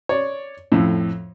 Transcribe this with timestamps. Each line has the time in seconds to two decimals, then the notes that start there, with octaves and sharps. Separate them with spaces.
0.09 C#5 D5
0.72 F2 A2